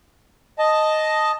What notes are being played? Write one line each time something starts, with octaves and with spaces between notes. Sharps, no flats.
D#5 A5